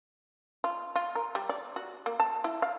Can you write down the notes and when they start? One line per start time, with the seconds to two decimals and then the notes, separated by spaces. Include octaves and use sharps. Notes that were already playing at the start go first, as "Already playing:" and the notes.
0.64 F4
0.96 F4
1.15 A#4
1.35 G3
1.49 D5
1.76 F#4
2.06 A#3
2.20 A5
2.44 E4
2.62 F5